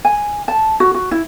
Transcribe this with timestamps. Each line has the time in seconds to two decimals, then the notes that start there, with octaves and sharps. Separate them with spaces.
0.05 G#5
0.48 A5
0.80 F#4
0.95 F#4
1.11 E4